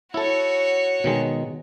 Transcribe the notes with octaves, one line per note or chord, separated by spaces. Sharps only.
E4 F#4 A4 C#5
B2 D#3 G#3